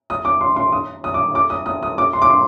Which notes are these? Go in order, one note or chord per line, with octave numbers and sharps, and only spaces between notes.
D#6
D6
C6
C6
D#6
D#6
D6
D6
D#6
D#6
D#6
D6
C6
D6
C6